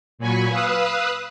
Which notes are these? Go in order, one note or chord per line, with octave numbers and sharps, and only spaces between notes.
A#2 F#3 G#5 B5 C#6
B4 F5 D#6 E6 F#6